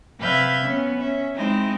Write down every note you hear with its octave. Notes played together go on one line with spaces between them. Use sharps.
C3 B4 E5 F5 G6 G#6
B3 C#4
C#4 E5
G#3 C4 D#4 E4 C5